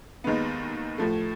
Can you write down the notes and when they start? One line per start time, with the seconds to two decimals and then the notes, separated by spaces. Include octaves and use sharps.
0.24 D#2 D#3 G#3 B3
0.98 A2 F3 A3